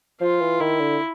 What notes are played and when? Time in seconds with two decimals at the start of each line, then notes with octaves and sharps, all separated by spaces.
0.21 F3 F4
0.41 E3
0.61 D#3 E4
0.80 D3